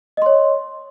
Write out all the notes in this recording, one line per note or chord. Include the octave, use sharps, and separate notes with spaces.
C#5 D#5 C6